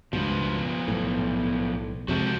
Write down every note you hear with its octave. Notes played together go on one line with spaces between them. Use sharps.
C#2 G2 B2 F3 B3
B1 A2
F2 C3 G#3 F#4 C5 A5